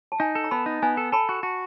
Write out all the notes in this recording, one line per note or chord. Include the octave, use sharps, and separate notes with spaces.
A5
D#4 G#5 A#5
A4
A#5
B3 A5 B5
D#4
B3 G#5 A#5
A4
A4 A5 B5
F#4
F#4